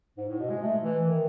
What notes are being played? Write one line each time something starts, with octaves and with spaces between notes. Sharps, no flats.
G#2
A2
B2
G#3
A3
E3
D#3